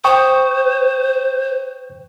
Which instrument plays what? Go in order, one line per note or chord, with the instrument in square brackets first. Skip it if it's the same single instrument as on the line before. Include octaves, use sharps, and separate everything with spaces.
[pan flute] C5 [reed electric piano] G5 C#6 D#6